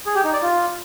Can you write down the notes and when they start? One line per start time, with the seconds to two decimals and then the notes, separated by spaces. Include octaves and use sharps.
0.06 G#4
0.15 G4
0.24 D#4
0.33 D5
0.42 F4